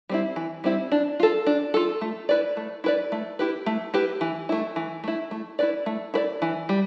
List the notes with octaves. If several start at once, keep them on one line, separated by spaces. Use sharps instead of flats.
G3 C4 E4
E3
G3 C4 E4
D4
F4 A4
D4
F4 A4
A3
E4 B4 D5
A3
E4 B4 D5
A3
E4 G4 B4
A3
E4 G4 B4
E3
A3 E4
E3
A3 E4
A3
E4 B4 D5
A3
E4 B4 D5
E3
G3